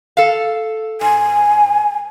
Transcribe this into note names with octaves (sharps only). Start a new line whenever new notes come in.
A4 F5
G#2 G#5